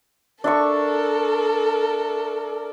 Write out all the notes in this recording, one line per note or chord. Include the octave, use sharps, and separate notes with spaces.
D4 A4 A#4 E5 C#6